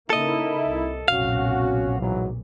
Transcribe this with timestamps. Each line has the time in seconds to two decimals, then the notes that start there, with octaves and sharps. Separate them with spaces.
0.10 C#3 A#3 D#4 E4 A4 D#5
0.68 C2
1.08 F1 B1 A#2 C#4 F#4 F5
1.99 G#2 E3 F#3